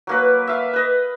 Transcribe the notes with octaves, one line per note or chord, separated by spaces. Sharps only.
F#3 A#3 B4
E5 F5
B4 D#5